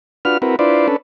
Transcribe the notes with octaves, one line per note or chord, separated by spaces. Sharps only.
D4 F4 F#4 B4 F6
C4 E4 F#4 A#4 B4
D4 E4 F4 B4 C5 D5
C#4 D4 A4 B4